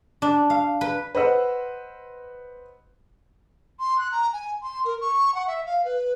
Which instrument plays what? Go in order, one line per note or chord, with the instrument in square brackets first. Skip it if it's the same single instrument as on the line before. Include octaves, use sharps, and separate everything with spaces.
[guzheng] D4
F5
B4
[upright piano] B4 C5 D#5 F#5 E6
[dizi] C6
F#6
A#5
G#5
C6
A#4
C#6
F#5
E5
F5
B4